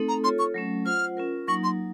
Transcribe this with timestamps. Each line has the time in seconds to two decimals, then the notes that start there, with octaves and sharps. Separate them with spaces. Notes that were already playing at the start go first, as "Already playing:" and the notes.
Already playing: A3 C4 D#4 A4
0.08 A#5
0.24 F4 A4 C#5 C6
0.39 C#6
0.54 F#3 A3 C#4
0.86 F4 C5 F#5 F6
1.17 C#4 F4 A#4
1.48 F#3 A#3 D#4 C#6
1.64 C6